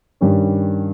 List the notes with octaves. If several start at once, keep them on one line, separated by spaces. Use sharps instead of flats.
G2 D#3 G3 C#4